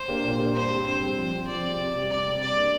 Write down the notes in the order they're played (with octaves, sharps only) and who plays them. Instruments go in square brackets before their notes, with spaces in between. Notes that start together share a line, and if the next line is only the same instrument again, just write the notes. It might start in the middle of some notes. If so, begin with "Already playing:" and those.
Already playing: [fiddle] C5
[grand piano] A#3 D4 G4
A#2
A#3 D4 G4
[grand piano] G2 [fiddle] C5
[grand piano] G3 C4
[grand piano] G2 [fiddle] C5
[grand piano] G3 C4
F3
C4 G4
[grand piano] F3 [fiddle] D5
[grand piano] C4 G4
C3
G3 C4
[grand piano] C3 [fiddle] D5
[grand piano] G3 C4
[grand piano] C3 [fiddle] D5
[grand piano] A#3 D4 G4